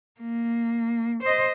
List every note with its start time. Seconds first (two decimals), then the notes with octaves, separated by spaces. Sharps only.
0.20 A#3
1.23 C5 D#5